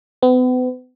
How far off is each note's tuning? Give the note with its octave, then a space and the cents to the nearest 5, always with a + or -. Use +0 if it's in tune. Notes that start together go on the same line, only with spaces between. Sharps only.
B3 +40